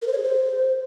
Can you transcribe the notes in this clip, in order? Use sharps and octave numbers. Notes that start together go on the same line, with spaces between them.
A#4
C5
C#5
G#4
C5